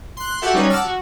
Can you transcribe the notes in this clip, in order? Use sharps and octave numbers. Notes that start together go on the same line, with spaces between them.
C6 F#6
F#4 G4 A4 E5 F#5
G3 C#4 D#4 B4 C#5
F#5 A5 D6 E6 F6
F#4